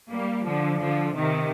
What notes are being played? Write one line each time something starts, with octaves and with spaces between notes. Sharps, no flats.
G3 A#3
D3 F3
D3 F3
C3 D#3